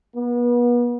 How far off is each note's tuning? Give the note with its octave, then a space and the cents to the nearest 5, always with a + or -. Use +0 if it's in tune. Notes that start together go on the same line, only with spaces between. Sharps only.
B3 -35